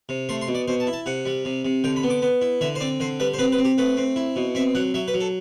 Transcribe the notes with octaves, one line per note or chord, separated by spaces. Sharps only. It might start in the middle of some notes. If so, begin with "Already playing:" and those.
C3
A3 C6
C6
B2
D5
B2 C5
A5
E4
A5
C3 F#5
G3
C3
C3
D3 G5
B5
B3
D6
B3
E4
D3 E5
C5
C4 D5
D3 C5
G3 B4
C5
C4 B4
B4
C4
G4
A3 B4
C4
E4
B2
C4 E5
F#3 F#5
F#3 E5
B4
F#3
A4